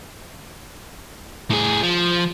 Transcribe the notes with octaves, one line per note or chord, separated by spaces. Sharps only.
A2 G#4
F3